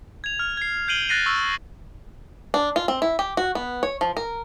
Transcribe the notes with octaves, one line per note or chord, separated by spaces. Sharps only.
G#6 F7
F6
G#6 C7
G6 C7 D7 D#7 F#7 G7
F#6 A6 A#6 C7 D#7
C#6 E6
D4
F4
C4
E4
G4
F#4
B3
C#5
F3
A#4